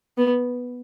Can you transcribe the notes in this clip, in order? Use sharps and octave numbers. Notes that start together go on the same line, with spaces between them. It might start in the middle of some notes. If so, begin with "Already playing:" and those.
B3